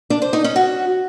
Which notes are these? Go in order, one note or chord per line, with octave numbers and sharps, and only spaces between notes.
D4
C5
D#4
C#4
F#4